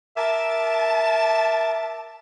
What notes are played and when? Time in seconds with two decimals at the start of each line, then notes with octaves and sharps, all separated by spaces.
0.17 A#4 E5 A5 D6